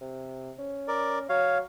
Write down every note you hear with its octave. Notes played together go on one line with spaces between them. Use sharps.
C3
C#4
A#4 D5
F#3 C#5 F5